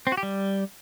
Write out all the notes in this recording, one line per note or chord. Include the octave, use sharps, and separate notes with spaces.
C4
F#4
G4
G3